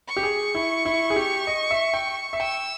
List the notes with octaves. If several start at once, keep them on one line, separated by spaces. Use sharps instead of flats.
C#6
G4
G#4
E4
E4
G#4
G4
D#5
E5
G5
E5
G5 E6